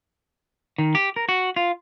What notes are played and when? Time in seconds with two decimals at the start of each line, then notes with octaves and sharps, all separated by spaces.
0.78 D#3
0.95 G4
1.16 A#4
1.29 F#4
1.56 F4